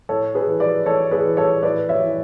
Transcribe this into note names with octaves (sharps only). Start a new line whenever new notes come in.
A2 A4 C#5
G#4 B4
E3
B4 D5
E3 A4 C#5
G#4 B4
E3
A4 C#5
A2 B4 D5
C#5 E5
E3